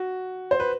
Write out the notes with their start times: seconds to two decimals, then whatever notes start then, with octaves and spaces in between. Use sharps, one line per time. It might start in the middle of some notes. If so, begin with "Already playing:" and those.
Already playing: F#4
0.51 C5
0.60 B4